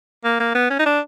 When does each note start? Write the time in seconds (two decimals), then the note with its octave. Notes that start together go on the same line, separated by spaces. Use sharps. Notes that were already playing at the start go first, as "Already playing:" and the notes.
0.24 A#3
0.40 A#3
0.55 B3
0.70 C#4
0.79 D#4
0.86 D4